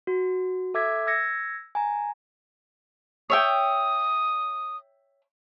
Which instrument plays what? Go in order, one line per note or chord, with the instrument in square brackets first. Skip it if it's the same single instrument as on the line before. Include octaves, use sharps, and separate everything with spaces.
[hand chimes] F#4
A4 E5 D6 E6 G#6 B6
E6 G#6 A#6 C#7
G#5 A#5
[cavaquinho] C#5 E5 G5 [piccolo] D#6